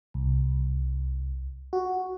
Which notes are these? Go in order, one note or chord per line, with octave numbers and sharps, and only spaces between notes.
C2
F#4